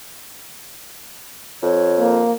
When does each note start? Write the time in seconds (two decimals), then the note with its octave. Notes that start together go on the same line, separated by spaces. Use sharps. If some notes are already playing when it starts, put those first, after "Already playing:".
1.63 F2 C#5
2.00 A#3